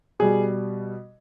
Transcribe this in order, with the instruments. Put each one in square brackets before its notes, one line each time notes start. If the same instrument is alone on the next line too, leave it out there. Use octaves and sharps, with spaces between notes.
[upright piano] B2 G3 G#4